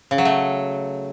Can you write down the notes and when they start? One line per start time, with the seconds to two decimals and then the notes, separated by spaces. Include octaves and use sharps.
0.11 C#3
0.18 F#3
0.25 A3